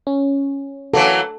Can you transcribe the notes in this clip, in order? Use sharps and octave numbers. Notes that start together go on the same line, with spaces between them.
C#4
E3 F#3 A#3 A4